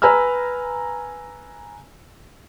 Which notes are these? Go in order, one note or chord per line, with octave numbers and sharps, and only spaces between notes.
B4 G#5 A#5 E6 F6